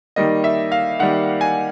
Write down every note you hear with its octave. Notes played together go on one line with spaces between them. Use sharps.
D#3 G3 A#3 D#5
E5
F5
D#3 G3 A#3 F#5
G#5